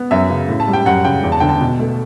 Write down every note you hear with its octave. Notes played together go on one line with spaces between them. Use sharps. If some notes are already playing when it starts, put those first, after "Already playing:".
Already playing: B3
F#2 E5
C#3
A2
A5
G3
G5
F#2 F#5
C#3 G5
E2
A5
D3 G5
A5
B2
A3